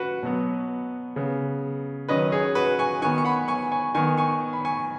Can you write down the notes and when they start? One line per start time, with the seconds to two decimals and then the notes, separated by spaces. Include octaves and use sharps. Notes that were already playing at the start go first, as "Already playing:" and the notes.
Already playing: C#4 F#4 B4
0.23 B2 F#3 B3
1.16 C#3 B3
2.08 D#3 F#3 C#4 B4 D#5
2.32 G#4 C#5
2.55 F#4 B4
2.79 G#5 C#6
3.02 D#3 B3 G#5 C#6
3.18 C#6
3.25 F#5 B5
3.48 G#5 C#6
3.71 G#5 C#6
3.95 D#3 B3 G#5 C#6
4.17 G#5 C#6
4.53 B5
4.65 G#5 C#6